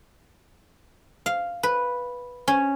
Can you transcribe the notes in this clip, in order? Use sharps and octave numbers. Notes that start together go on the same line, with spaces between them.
F5
B4
C#4